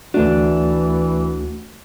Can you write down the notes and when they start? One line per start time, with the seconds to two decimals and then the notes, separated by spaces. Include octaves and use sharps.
0.14 D2 E3 A3 D4 F#4